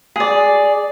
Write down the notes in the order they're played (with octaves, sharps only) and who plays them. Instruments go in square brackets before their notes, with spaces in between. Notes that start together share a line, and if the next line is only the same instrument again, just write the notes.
[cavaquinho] G#4 D5